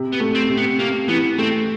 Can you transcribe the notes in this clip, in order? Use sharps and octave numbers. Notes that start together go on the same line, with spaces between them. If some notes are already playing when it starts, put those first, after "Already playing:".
Already playing: C3
B3
A3
C4
C3
B3
C3 A#3
E3 B3
A3 C4